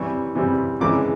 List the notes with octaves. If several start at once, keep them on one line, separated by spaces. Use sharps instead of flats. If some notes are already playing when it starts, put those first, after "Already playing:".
Already playing: C3 E3 G3 C#6
C3 E3 G3
F2 C#3 E3 G#3 D6